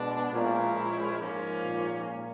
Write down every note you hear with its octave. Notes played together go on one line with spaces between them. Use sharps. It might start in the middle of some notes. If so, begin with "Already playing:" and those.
Already playing: B2 G#3 B3 D4
A#2 F3 G#3 C#4 E4
G#2 F3 A#3 C#4
A#2